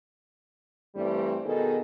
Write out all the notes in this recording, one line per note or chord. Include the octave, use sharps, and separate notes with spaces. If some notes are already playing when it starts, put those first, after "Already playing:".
G2 E3 G3 A3 C4
B2 D#3 D#4 G#4 A4